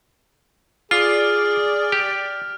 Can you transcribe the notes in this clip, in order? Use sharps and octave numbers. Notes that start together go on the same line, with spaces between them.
F4 G#4 D5 F6
G4